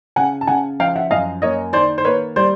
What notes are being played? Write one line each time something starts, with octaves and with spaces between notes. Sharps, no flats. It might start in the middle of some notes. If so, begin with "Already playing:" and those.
C#3 F#5 G#5
A5
C#3 F#5 G#5
F3 F5 G5
E5 F#5
F#2 D#5 F5
A#3 C#5 D#5
D#3 C5 D5
C5
A#3 B4 C#5
G3 C5 D5